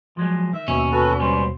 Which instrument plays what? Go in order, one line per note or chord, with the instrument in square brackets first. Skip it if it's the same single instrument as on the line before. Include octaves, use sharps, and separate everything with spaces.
[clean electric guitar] F3 F#3 G#3
[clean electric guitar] D#3 [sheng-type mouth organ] E5
[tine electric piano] D#2 B2 [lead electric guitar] C#4
[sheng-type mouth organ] F#4 A4 B4
[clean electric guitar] C#2 G3 B3 [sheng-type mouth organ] C5